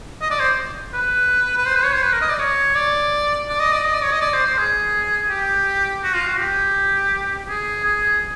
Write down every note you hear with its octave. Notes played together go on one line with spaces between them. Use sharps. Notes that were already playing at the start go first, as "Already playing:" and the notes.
D#5
D5
C5
B4
B4
C5
B4
C#5
C5
B4
A#4
D#5
D5
C#5
D5
D5
D#5
D5
D#5
D5
C#5
D#5
D5
C5
C5
G#4
G4
F#4
F4
F#4
G4
G#4
G#4